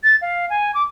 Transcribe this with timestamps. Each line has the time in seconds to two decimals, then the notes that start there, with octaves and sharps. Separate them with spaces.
0.04 A6
0.21 F5
0.50 G#5
0.74 D6